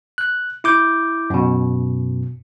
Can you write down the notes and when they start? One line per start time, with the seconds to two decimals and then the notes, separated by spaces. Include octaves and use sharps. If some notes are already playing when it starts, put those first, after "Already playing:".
0.18 F#6
0.64 E4 D6 G6
1.30 F#2 B2